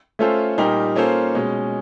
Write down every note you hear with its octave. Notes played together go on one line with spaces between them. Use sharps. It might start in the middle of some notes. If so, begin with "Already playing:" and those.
A3 C#4 F4 A4 C5
A#2 G3 A#3 D#4 G4
A#3 C#4 F4 A4 C5
B2 G#3 C#4